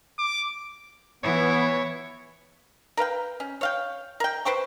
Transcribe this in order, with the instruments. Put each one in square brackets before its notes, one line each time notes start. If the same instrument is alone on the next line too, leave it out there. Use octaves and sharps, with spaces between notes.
[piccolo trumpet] D6
[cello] E3 E4 [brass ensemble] B3 [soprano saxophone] C#5
[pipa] A#4 B4 F5 G5
C#4
C#5 F5 G5
A#4 G5
B4 C5 G5 C#6